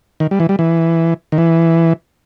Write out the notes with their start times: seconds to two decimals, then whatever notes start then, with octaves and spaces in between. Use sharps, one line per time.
0.20 D#3
0.31 G3
0.40 E3
0.49 G3
0.59 E3
1.32 D#3
1.38 E3